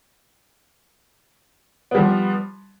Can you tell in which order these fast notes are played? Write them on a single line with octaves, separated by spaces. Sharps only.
B3 G3 F3